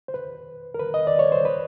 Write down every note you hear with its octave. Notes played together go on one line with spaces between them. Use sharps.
C5
B4
A#4
B4
D#5
D5
C#5
C5
B4